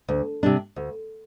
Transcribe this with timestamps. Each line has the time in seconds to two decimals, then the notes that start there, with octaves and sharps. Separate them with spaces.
0.08 D2
0.43 C3 G3 D4
0.76 D2